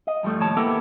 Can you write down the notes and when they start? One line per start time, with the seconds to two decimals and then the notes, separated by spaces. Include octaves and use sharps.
0.07 D#5
0.23 G2 F3 G3 A3
0.40 D#2 A2 C#5 A5
0.57 A#3 B3 E4 G4 A4 A#4